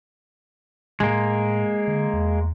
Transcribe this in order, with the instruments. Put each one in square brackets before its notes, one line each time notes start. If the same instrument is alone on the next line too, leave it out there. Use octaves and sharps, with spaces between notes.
[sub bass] A2 [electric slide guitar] G#3 A#3
[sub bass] D3
E2